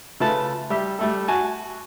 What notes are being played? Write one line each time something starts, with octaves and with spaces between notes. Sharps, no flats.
C#3 A3 F4 B4 A5
G3 G4 E5
G3 A3 A4
F#4 G#5 A5